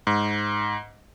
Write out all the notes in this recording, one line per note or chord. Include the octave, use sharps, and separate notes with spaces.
G#2